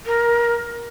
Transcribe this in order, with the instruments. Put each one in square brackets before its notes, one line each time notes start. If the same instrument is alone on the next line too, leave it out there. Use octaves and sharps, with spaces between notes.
[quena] A#4